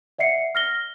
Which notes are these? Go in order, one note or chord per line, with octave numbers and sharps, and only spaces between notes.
D5 E5 F#5 C7 C#7
F6 A#6 G7